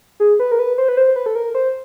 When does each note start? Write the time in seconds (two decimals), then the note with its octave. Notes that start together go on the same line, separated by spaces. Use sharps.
0.20 G#4
0.40 B4
0.52 A#4
0.59 B4
0.78 C5
0.89 B4
0.97 C5
1.16 B4
1.26 A4
1.35 A#4
1.55 C5